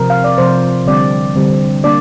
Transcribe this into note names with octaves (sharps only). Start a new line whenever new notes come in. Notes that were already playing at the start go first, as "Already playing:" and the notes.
Already playing: C3 F3 C4 A#4
F5
D5
C3 F3 C4 C5
D3 G3 C4 D5
D3 G3 C4
A#3 D4 D5